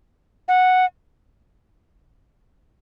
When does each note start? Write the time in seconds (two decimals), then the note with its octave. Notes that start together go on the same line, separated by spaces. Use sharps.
0.48 F#5